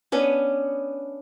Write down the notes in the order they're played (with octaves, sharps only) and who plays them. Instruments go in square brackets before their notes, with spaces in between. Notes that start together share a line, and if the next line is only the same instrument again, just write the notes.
[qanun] B3 C#4 D4